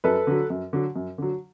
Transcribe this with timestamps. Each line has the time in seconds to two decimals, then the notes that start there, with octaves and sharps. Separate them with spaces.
0.04 F#2 A4 B4
0.27 D3 F#3
0.50 F#2
0.73 D3 F#3
0.96 F#2
1.18 D3 F#3